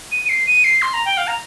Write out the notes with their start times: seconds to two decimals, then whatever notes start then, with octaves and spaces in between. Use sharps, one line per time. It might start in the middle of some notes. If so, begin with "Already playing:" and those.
0.12 D#7
0.25 D#7
0.29 C7
0.47 D#7
0.64 C7
0.82 C6
0.94 A#5
1.05 G5
1.17 F5
1.27 A#5